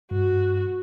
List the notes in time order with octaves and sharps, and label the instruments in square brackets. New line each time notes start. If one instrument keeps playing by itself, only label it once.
[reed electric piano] G2 [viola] F#4